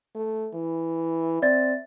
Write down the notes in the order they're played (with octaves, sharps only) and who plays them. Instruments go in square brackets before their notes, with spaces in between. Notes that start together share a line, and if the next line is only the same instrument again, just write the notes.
[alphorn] A3
E3
[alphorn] C4 [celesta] D5 E5 A6